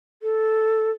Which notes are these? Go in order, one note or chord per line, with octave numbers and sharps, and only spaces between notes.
A4